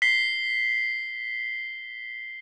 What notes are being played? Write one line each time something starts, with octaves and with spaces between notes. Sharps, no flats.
B6 C7 G7